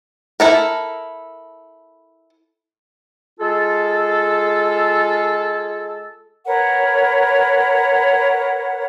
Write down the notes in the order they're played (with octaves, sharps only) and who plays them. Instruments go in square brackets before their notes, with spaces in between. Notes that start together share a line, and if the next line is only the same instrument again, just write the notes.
[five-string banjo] E4 A4 A#4
[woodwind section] G#3 F4 G#4 A4
[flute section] A#4 B4 C#5 F#5